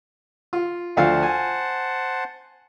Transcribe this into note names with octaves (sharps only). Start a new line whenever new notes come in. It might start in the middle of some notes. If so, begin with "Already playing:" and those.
F4
D2 F3 C5 F5 F#5 A5
G#5